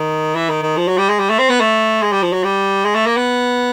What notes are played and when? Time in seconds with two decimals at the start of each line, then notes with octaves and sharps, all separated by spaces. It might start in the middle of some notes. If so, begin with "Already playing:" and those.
Already playing: D#3
0.35 E3
0.49 D#3
0.62 D#3
0.77 F3
0.88 F#3
0.98 G3
1.09 G#3
1.19 G3
1.29 A3
1.39 C4
1.49 B3
1.60 A3
2.02 G#3
2.12 G3
2.22 F3
2.33 F#3
2.44 G3
2.84 G#3
2.95 A3
3.06 A#3
3.17 B3